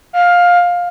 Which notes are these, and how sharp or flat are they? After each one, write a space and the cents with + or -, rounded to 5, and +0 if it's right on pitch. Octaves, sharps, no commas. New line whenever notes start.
F5 +15